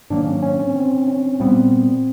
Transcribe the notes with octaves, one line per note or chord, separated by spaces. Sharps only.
G#2 D#3 F#3 A#3 D4
C#4
C#4
C4
C4
C#4
A#2 G3 B3 C4